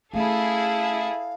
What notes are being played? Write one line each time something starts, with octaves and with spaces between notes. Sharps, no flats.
A3 C#4 E4 G#4 A4 F5